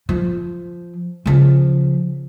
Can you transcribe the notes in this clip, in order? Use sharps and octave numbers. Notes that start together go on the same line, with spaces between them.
F3
C#3 F3